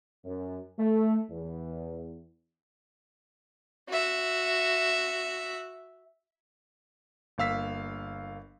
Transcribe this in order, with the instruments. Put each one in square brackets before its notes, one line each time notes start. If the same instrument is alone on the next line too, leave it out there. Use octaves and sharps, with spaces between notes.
[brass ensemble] F#2
A3
E2
[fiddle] F#4 E5
[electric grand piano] G1 A#3 F5 E6 B6